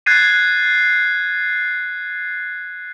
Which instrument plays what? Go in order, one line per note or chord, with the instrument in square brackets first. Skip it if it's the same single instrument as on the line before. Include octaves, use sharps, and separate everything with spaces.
[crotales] F#6 G#6 A6 C7 D#7